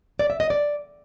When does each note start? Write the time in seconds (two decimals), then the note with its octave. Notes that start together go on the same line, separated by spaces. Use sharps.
0.19 D5
0.30 E5
0.40 D#5
0.50 D5